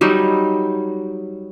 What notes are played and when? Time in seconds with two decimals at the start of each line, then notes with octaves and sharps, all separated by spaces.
0.01 F#3 G3 D#4